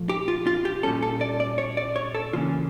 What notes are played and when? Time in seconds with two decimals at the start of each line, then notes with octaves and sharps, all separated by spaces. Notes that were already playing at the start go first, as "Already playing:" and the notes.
Already playing: A#2 F3 A3
0.09 G4
0.28 F4
0.47 F4
0.65 G4
0.83 A#2 G3 C#4 A4
1.03 A4
1.21 D5
1.40 D5
1.58 C#5
1.77 D5
1.96 C#5
2.15 A4
2.33 C#3 E3 A#3 C#4 F4